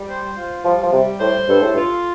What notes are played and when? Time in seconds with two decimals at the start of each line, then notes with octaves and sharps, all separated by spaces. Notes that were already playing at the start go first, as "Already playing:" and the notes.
Already playing: G3
0.09 C5
0.36 F4
0.64 F3 G3
0.83 F3
0.92 C3 G3
1.20 A2 C5
1.48 G2 A4
1.61 A2
1.74 G2 F4